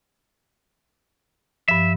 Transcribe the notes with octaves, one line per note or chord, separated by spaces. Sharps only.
G2 F3 E5